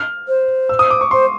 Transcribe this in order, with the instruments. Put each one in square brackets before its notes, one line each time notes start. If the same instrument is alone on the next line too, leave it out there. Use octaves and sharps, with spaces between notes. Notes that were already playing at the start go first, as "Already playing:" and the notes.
Already playing: [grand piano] F6
[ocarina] C5
[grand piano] E6
D#6
D6
C#6
[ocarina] C5 [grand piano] C6